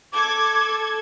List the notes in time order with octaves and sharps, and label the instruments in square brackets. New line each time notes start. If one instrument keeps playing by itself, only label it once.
[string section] A4 G#6 [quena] D6